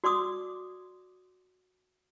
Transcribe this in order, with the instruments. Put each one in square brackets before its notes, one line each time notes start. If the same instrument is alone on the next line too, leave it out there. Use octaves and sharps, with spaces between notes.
[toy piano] F#4 D5 C6 D6 D#6